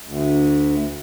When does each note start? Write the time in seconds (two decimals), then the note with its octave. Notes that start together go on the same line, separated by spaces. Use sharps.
0.06 D2